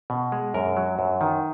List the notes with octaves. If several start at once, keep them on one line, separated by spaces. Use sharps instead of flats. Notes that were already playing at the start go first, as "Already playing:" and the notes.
B2
G#3
F#2 A#4
F#3
F#2
D#3